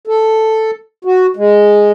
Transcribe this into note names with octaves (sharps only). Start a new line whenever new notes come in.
A4
F#4
G#3